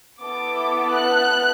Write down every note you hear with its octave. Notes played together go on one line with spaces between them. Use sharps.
B3 E4 A4 D6
F#6